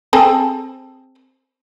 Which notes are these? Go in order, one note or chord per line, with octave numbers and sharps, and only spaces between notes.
C4 G#4 A4